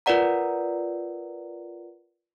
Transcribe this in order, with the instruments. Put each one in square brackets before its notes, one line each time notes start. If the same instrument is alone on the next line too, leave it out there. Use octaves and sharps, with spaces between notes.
[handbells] F4 A#4 B4 D5 F#5 A#5